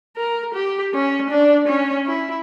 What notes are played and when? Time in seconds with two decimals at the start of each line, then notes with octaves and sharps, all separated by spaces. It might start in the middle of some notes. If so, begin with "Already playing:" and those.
0.16 A#4
0.54 G4
0.93 C#4
1.30 D4
1.68 C#4
2.06 E4